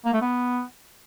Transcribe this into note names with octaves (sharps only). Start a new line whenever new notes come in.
A#3
A3
B3